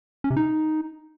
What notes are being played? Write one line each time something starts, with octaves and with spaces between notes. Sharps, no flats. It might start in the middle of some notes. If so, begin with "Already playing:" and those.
C#4
C3
D#4